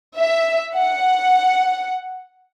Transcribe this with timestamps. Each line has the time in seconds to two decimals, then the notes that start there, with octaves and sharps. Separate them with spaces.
0.19 E5
0.76 F#5